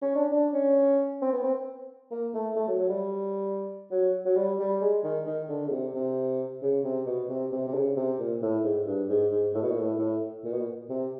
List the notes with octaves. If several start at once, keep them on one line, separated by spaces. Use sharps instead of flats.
C#4
D4
D4
C#4
C4
B3
C4
A#3
A3
A3
F#3
F#3
G3
F#3
F#3
G3
G3
G#3
D#3
D#3
D3
C#3
C3
C3
C#3
C3
B2
C3
C3
C3
C#3
C3
A#2
A2
G#2
G2
G#2
G#2
A2
B2
A#2
A2
A2
A#2
B2
A#2
C3